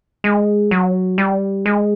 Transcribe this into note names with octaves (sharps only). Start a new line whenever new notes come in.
G#3
F#3
G3
G#3